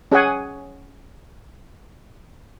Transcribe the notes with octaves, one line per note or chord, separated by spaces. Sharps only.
C#4 G#4 C#5 F#5 G#5